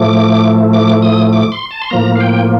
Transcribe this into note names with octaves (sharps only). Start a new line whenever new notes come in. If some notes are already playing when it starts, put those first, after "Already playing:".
Already playing: A2 F3 A3 D6
D6
D#6
D6
C6
A5
C6
A2 F3 A#3 A#5
F5
G5